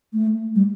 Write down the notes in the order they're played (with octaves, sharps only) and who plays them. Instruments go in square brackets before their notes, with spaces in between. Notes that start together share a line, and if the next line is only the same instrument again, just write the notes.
[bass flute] A3
G3